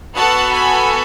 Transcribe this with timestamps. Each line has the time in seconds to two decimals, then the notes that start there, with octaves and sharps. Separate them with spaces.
0.16 B3 F#4 A4 F#5 A5
0.53 G#5 B5